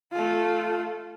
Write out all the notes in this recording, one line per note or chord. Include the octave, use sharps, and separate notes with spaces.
A3 F4